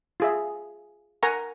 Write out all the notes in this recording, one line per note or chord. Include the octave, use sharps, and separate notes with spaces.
F4 G#4 E5
A#4 F#5 G#5 A#5 C#6